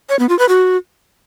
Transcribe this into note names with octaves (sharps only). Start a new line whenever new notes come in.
C#5
B3
F4
B4
F#4